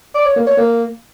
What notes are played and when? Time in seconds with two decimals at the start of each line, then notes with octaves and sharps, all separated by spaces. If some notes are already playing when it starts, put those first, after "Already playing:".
0.15 D5
0.25 C#5
0.36 A#3
0.47 C#5
0.57 A#3